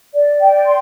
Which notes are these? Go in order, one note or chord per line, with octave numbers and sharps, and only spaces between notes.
D5
G5
C6